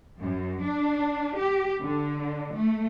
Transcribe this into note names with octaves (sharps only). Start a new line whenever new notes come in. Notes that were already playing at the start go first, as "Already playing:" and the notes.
F#2
D4
G4
D3
A3